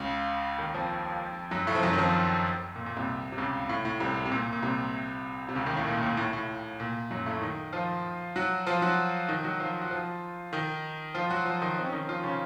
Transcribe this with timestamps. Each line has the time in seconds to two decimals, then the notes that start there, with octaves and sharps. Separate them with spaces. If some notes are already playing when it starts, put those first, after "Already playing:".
Already playing: C#2 C#3
0.58 D#2 D#3
0.74 F2 F3
1.51 F#2 F#3
1.67 A2 A3
1.75 F3
1.83 F#2 F#3
1.93 D#3
1.98 F2 F3
2.76 A#2
2.86 A#2
2.96 C2 C3
3.32 C3
3.38 C#2 C#3
3.69 A2
3.85 A2
4.00 C2 C3
4.25 C3
4.32 A#2
4.53 A#2
4.63 C2 C3
5.48 C3
5.55 C#2 C#3
5.66 D#2 D#3
5.77 A2
5.87 A#2
6.03 A#2
6.17 A2
6.33 A2
6.80 A#2
7.11 F#2 F#3
7.26 A2 A3
7.42 D#3 D#4
7.73 F3 F4
8.36 F#3 F#4
8.67 F3 F4
8.82 F#3 F#4
9.28 D#3 D#4
9.44 F#3 F#4
9.60 F3 F4
9.81 F#4
9.91 F3 F4
10.53 D#3 D#4
11.14 F3 F4
11.30 F#3 F#4
11.46 F3 F4
11.62 D#3 D#4
11.78 C4
11.85 C#4
11.92 D#3 D#4
12.08 F3 F4
12.23 C#3 C#4